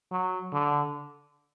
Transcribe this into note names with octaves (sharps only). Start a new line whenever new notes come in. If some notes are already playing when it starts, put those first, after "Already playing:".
F#3
D3